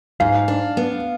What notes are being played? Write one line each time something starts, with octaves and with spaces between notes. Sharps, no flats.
G#2 F5
D4
B3